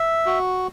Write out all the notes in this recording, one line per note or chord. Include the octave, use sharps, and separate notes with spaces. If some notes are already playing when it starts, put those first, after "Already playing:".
Already playing: E5
F#4